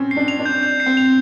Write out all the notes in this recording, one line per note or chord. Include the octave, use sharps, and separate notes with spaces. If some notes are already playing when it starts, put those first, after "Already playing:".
Already playing: C4 C#4
C7
D4
F7
D4
G6
G6
C7
C4
F7